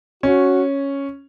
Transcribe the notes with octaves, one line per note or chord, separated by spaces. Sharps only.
C#4 F#4